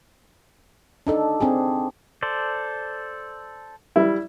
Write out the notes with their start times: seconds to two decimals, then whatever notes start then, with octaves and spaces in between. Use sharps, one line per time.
1.07 D4 D#4 A4
1.40 C4 D4 G#4
2.23 A4 C5 D5
3.96 G3 E4